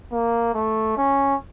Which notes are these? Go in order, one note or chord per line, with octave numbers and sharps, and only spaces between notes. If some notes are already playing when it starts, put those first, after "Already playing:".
A#3
A3
C#4